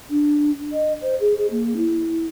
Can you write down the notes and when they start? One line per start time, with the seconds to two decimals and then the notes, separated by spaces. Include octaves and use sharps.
0.10 D4
0.72 D#5
1.01 C5
1.20 G#4
1.37 G#4
1.50 A#3
1.76 E4